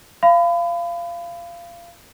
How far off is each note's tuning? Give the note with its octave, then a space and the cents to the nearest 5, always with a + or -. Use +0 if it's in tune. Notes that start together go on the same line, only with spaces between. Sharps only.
F5 -25 B5 +30